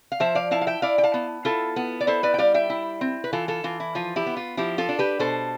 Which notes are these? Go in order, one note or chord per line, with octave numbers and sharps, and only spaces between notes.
F5
F3 C5 E5
D5 F5
E4 F5 A5
F5
E5 G5
E4 D5 F5
G5
F5 A5
B3
E4 F4 A4
B3
D5
E4 A4 C5
B4 D5
G5
G3 D5 F5
E5 G5
E4
C4
B4
E3 F4 A4
F4 A4
E3 F4
E4
F3 F4
E4 G4
B3
F4
F3 E4 G4
F4 A4
D4
G4 B4
B2 A4 C5